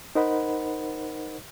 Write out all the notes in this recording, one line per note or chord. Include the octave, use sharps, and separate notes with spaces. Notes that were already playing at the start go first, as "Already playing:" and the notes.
D#4 A#4 C5 D#5 F#5 B5